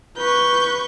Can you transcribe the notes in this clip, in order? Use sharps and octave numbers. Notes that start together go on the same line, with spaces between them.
B4 C#6 G6